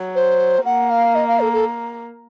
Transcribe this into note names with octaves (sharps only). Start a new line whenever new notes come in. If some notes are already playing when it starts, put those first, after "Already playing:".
Already playing: F#3
C5
A#3 F#5
F5
D#5
F5
A4
A4